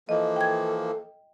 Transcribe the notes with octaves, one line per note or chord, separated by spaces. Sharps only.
E3 F3 A#3 A4 D#5
G5 G#6